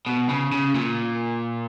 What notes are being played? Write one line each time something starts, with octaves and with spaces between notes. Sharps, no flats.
B2
C#3
C#3
A#2